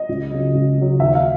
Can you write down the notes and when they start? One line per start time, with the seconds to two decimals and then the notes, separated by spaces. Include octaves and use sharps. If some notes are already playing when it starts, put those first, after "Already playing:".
Already playing: D#5
0.09 C#2
0.31 C#3 F#3
0.54 C#2
0.77 C#3 F#3
1.00 D#2 E5
1.15 F5